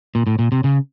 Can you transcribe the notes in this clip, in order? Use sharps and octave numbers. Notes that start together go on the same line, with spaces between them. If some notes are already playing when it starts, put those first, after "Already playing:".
A#2
A2
A#2
C3
C#3